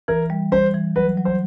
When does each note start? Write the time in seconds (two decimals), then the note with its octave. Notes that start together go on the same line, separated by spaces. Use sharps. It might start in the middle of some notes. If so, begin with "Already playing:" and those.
0.08 E3 A#4
0.30 G3
0.52 G3 C5
0.74 E3
0.96 F#3 B4
1.17 F#3
1.25 C5